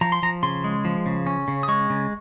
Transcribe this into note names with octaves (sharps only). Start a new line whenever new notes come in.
F3 A#5
C6
F3 A#5
C#3 C6
G#3
F3
C#3
C#4
C#3
D#6
G#3 C#6
C#3